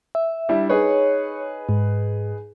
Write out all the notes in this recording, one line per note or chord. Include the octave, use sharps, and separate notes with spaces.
E5
G3 D4 E4
D#4 G#4 B4 C#5
G#2